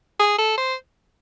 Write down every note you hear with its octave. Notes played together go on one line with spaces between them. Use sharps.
G#4
A4
C5